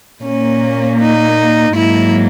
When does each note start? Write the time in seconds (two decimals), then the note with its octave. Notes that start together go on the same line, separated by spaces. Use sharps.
0.23 A#2 A#3 C#4
0.99 D#4
1.75 G#2 F#3 A#3 E4